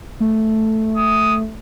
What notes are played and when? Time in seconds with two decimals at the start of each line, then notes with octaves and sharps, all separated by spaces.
0.20 A3
0.97 D#6